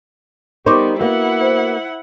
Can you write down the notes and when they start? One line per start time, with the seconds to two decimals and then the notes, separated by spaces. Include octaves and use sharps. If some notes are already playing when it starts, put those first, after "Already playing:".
0.66 G3 B3 D#4 A#4 C5 C#6 D6
1.01 A#3 B3 E4 F#4 F#5
1.41 C5